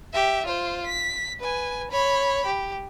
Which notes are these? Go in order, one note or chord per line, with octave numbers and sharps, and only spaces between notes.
G4 E5
F4 C5
B6
B4 G#5
C#5 B5
G4